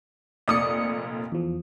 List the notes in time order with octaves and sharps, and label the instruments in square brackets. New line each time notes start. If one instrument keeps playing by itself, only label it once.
[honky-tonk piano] F1 A#2 D#6 [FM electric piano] D5 C#7
[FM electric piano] E2 F3